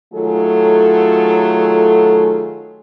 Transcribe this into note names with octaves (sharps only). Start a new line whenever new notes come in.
D#3 F#3 A3 F4 G#4 A4